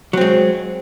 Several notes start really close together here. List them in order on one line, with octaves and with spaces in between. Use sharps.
F#3 C4 G#3